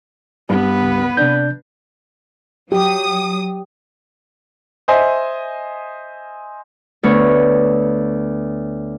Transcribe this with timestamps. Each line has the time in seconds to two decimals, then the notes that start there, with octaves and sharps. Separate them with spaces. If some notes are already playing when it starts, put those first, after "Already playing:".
0.49 G2 B3 B4
0.83 C#2
1.17 C3 D4 G6
2.72 F#3 G4 D#6
4.88 C5 D#5 E5 G#5
7.03 D2 B3 C#5